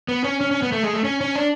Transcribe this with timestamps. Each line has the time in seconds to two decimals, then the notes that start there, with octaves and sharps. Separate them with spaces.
0.09 B3
0.24 C#4
0.41 C#4
0.51 C#4
0.62 B3
0.72 A3
0.84 G#3
0.94 A3
1.04 C#4
1.21 C#4
1.36 D4